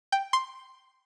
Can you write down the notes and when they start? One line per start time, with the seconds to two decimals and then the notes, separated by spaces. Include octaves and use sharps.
0.12 G5
0.33 C6